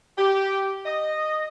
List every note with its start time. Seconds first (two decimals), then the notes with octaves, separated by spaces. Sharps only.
0.18 G4
0.85 D#5